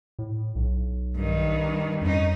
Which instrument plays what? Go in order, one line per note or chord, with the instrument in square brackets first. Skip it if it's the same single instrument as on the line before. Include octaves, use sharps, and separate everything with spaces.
[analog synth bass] A2
B1
[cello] G2 D#3
[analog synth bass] F2 [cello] C#4 D#4